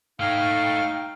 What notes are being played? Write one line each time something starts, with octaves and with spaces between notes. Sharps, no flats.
A3 D#4 C#5 F5 G5